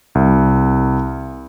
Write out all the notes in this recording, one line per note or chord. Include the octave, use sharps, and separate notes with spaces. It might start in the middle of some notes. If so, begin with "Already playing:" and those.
C2